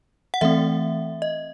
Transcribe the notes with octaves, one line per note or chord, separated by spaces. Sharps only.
F#5
E3 A3 C4 E5
D#5